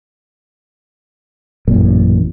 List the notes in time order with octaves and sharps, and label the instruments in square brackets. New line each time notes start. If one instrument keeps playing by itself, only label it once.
[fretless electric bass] A1 F#2 A#2